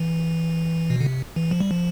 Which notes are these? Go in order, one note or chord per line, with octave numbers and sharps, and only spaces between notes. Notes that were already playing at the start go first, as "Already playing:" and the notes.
Already playing: E3
B2
D3
C3
E3
F3
G3
F3